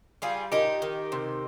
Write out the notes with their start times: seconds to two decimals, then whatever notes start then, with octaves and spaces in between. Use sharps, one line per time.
0.22 G3 F4 G#4
0.52 A#2 D#4 G4
0.82 D#3
1.12 C3